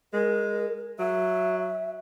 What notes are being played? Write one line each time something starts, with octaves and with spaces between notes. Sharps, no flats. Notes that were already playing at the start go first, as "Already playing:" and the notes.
G#3 A#4
F#3 E5